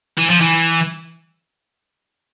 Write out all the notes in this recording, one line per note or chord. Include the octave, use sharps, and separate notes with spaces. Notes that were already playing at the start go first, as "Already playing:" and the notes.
E3
F3
E3